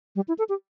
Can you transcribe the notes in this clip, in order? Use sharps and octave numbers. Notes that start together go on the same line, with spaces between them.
G3
E4
A4
G4